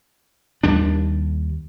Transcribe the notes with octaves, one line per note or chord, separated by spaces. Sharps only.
D#2 G3 D4